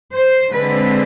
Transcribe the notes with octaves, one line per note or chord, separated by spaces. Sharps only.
C5
D3 G#3 C4 B4